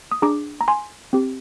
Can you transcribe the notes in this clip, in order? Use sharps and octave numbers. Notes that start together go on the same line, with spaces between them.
D#6
D4 G#4 A#5 D6
A#5
G#5 C6
C4 G4